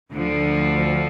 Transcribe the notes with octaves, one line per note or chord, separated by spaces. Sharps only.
D2 D3 F3